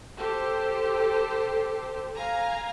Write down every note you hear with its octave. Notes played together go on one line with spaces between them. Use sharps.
G4 A4 C5
F5 G#5 A#5